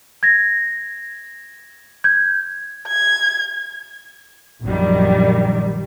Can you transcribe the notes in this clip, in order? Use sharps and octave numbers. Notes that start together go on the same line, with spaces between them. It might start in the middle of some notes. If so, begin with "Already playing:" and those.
G#6 A#6
G6 G#6
G#6
A#1 F#2 D#3 G3